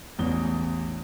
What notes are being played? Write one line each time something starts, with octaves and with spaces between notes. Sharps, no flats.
A1 E2 G7